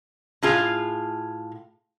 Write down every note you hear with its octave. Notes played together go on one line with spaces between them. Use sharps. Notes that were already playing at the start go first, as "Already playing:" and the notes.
A2 F4 G#4 F5